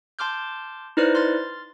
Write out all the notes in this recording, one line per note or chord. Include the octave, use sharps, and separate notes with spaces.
A5 C6 D6 F6 G6
D#4 E4 B4 C5 D5 F6
C6 F6 A6